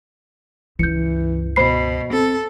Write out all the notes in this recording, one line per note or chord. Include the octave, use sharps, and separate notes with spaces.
C#2 G2 E3 G6 C#7
B2 C5 B5 C7
C4 A4